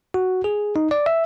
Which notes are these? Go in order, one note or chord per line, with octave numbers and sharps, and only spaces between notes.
F#4
G#4
D#4
D5
E5